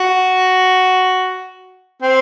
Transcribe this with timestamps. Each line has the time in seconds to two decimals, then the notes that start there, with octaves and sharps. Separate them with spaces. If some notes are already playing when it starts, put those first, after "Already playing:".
Already playing: F#4
2.03 C4